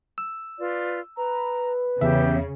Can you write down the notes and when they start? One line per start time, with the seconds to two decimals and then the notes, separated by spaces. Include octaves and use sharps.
0.18 E6
0.59 F4 B4 D5
1.17 B4 A#5
2.01 E2 C#3 G4 E5